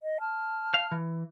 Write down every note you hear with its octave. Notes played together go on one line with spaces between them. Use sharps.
D#5
A5 F6
F5
E3